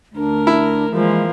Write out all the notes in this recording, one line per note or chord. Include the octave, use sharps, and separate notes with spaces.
D2 D4 A#4
E4
E3 F3 G#3 A#3